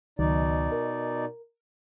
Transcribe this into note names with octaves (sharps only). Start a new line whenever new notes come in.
C#2 B2 D#3 F#3 D#4 D5
A#4